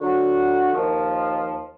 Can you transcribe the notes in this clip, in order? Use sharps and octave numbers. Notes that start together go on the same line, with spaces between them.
D3 F#3 F#4
D#2 D#3 F3